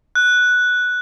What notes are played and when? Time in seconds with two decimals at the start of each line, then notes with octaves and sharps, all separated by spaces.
0.15 F#6